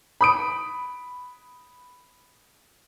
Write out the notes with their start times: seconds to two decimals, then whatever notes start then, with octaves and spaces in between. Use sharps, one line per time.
0.21 B5 D#6 D7